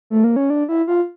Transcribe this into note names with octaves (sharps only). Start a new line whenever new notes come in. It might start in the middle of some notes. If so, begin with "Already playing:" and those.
A3
A#3
C#4
D4
E4
F4